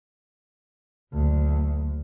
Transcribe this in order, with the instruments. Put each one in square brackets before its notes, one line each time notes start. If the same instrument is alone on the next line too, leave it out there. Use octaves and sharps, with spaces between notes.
[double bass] F#1 D2